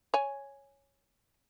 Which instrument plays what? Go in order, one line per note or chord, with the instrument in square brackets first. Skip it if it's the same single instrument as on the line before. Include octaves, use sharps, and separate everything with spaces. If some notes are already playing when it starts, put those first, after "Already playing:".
[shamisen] C#5 G#5